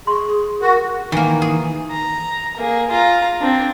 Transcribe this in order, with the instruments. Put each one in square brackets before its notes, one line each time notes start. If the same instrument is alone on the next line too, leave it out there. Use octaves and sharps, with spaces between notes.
[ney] G#4 [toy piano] C6 C#6
[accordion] F#4 [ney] A#4
[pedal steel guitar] D#3 [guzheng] E3 A#3
[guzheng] G#4
[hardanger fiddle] A#5
A#3 G#4
F4 A#5
C4 D4